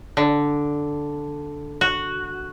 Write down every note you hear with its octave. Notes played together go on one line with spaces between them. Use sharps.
D3
F#4